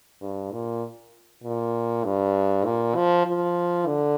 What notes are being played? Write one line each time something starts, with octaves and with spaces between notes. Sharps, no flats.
G2
A#2
A#2
G2
A#2
F3
F3
D3